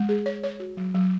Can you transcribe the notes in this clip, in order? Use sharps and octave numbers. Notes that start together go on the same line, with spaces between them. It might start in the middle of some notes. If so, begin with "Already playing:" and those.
Already playing: G#3
G#4
C#5
C#5
F#4
F#3
F#3